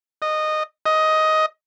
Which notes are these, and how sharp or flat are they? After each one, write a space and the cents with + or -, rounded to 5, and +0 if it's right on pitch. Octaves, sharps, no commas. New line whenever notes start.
D#5 -15
D#5 +10